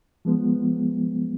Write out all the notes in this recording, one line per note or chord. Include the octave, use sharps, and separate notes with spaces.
F3 G#3 B3